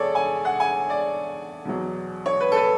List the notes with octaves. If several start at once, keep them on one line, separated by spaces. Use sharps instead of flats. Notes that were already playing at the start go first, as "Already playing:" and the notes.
Already playing: E2 G#4 A4 C#5 D5
G#5
F#5
G#5
D5
E2 B2 F#3
C#5
B4
A4
B4